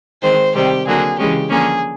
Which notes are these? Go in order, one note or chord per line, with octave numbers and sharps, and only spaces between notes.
D#3 G#3 C4 C5
C3 D#3 G3 C4 G4
D3 F#3 A#3 G#4
C#3 E3 G#3 C#4 G4
D3 F3 A#3 C#4 G#4